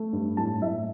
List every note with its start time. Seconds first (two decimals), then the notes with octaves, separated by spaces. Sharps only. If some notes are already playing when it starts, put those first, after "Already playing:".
Already playing: A3
0.13 G2
0.37 A2 A5
0.62 A2 E5